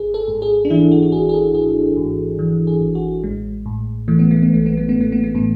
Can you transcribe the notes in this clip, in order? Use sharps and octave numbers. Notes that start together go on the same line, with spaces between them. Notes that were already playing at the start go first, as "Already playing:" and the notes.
Already playing: G#1 G#4
A4
G#2
G#4
D4
E3 E4
F#4
F#4
G#1 G#4
G#4
A4
G#1 G#4
G#2
E3
G#4
G#1
F#4
A1 G#3
A2
E3 A3
B3
A3
B3
A1 A3
B3
A3
A1 B3
A3
B3
A3
A2 B3